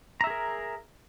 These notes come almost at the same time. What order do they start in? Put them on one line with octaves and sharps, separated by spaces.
A#5 E5 G#4 A#4